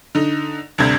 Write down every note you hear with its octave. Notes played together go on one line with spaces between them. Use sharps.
D3 D#4
D2 G2 C3 G#6